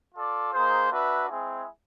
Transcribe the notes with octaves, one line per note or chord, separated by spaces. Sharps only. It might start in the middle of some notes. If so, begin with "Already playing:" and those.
F4 A4 D5
A#3 D#4 G#4 C5
D4 F#4 B4 E5
G#3 C4 E4 G#4